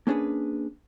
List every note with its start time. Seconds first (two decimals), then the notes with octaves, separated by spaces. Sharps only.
0.07 A#3 C#4 D4 G#4 B4